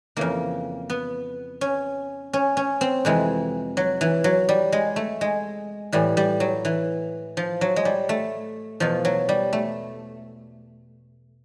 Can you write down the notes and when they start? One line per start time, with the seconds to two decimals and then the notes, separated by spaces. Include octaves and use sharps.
0.17 F2 C#3 E3 A#3
0.90 B3
1.61 C#4
2.33 C#4
2.57 C#4
2.81 C4
3.05 F2 C3 E3 G#3
3.77 F#3
4.01 E3
4.24 F#3
4.49 G3
4.72 G#3
4.96 A3
5.21 G#3
5.92 A2 E3 G3
6.17 G3
6.40 F#3
6.65 E3
7.37 F3
7.61 F#3
7.76 G#3
7.85 G3
8.09 A3
8.80 E2 B2 F3
9.05 F#3
9.29 G3
9.53 A3